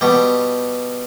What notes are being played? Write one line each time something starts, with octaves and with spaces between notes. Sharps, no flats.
B2 G3